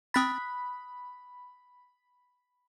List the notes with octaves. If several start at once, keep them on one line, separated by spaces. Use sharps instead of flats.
C4 B5 D#6 F#6 A6 B6